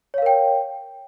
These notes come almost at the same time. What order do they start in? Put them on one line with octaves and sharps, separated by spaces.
C#5 F5 A#4 G5